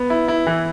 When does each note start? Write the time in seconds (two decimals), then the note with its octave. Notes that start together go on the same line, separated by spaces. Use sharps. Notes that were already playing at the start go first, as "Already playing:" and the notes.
Already playing: B3
0.10 E4
0.28 E4
0.47 E3